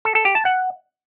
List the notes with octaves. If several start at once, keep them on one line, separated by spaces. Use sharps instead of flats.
A4
A4
G4
A5
F#5